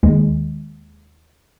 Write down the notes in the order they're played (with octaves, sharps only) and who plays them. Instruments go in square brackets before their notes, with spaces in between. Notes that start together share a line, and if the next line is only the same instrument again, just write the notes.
[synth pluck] D#2 G#3